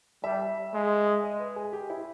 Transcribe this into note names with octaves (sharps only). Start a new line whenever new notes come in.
G3 E5
G#3
D#5
B4
G#4
G4
E4